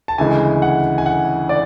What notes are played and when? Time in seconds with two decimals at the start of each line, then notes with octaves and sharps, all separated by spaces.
0.08 A5
0.18 D2 C#3 E3 G#3 G#5
0.62 F#5
0.98 G#5
1.06 F#5
1.49 D5